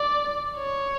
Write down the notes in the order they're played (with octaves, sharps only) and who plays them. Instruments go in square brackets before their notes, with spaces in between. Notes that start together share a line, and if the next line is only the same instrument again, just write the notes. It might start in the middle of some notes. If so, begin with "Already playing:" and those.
Already playing: [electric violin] D5
C#5